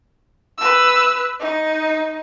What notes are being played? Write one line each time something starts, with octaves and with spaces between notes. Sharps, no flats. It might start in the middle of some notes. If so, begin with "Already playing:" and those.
B4 E6
D#4